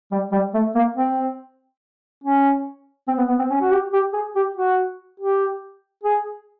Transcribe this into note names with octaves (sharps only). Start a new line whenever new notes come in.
G3
G3
A3
A#3
C4
C#4
C4
B3
B3
C4
C#4
F#4
G4
G4
G#4
G4
F#4
G4
G#4